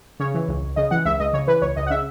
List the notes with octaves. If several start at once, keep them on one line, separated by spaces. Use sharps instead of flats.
C#3 C#5
E3
C#2
C#2
C#3 D#5
E3 F#5
C#2 E5
C#2 D#5
C#3 C#5
E3 B4
C#2 C#5
C#2 D#5
F#5
C#3 E5